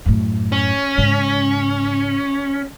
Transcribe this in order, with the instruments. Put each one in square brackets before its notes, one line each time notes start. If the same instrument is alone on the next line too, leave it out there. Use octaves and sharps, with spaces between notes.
[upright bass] F#2 A2
[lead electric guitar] C#4
[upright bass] G#2 C#3